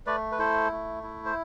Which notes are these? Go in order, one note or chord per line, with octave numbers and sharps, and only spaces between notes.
A3 B4 D5
B4
E4 A4 C5
A3
E4
C5